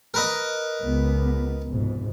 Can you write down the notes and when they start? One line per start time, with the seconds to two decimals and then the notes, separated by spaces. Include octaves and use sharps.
0.14 A#4 B4 D#5
0.82 C#2 B3
1.68 F1 G#2 B2